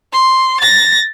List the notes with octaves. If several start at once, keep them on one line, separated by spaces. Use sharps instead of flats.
C6
A6 A#6